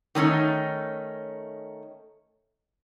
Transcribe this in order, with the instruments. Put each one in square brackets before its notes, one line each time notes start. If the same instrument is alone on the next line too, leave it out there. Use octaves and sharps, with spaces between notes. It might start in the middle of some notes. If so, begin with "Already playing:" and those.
[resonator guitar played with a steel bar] D#3 A3 C#4 D#4